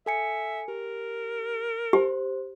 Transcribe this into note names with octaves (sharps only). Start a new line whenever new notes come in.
A4 E5 G#5 C#7
G4 A#4
G4 C5